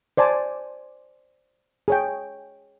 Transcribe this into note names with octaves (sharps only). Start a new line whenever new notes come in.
C5 D5 G#5 A5
G#4 C#5 G5